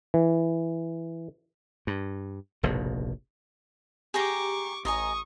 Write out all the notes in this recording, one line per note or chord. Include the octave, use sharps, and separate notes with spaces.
E3
G2
F1 A#1 G#2 B2
G4 G#4 G5 A#5 C#6 D6
A1 D#5 G#5 A#5 C#6 D#6